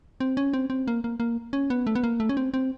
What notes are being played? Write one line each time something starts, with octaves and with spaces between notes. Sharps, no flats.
C4
C#4
C4
C4
A#3
A#3
A#3
C#4
B3
A3
B3
A#3
A3
C#4
C4
C4